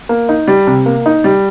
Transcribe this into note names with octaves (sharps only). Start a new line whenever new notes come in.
A#3
D#4
G3
C3
A#3
D#4
G3